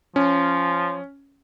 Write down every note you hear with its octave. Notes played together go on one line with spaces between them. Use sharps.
F3 C#4